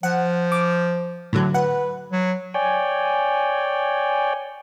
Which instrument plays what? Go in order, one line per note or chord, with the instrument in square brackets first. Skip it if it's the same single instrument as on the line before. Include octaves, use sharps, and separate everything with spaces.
[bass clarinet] F3 [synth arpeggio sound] F#5
[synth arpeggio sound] D6
A2 D3 F#3
[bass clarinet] B4 [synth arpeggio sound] F#5
[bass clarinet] F#3
[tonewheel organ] C#5 D5 G5 [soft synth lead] G#5